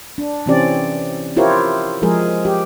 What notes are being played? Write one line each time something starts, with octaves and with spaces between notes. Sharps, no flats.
D4
C3 E3 C4 C#4 G4 D5
E4 F4 G4 A#4 C5 C#5
F3 G#3 G#4 A#4
G4